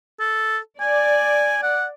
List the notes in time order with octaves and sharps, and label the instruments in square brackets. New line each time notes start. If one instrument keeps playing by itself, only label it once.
[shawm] A4
[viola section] D5 [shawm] G#5
[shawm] F#5